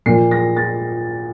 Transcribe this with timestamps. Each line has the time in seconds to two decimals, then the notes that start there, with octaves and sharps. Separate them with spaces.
0.06 A#2 C7
0.09 F3
0.31 A#6
0.57 A6